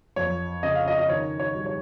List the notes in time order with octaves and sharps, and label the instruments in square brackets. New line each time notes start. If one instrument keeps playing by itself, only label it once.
[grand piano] F2 C#5
C#3 D#5
F5
D#5
D#5
D#3 C#5
C#5
G3
C#5